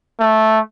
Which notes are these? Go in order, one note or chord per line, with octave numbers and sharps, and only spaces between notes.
A3